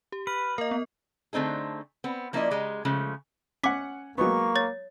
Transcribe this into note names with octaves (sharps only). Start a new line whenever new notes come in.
G4
B4 F6
A#3 A#4 D#5
B3
D3 A3 C4 D#4 G#4
B3 C4
F3 A#3 C#4 E4 D5 D#5
C#3 G#3 G4 D#5 A#5
C#3 F3 G#3 A3
C#4 F#5 D6 B6
F#3 G#3 A#3 B3 C#6
C#5 A6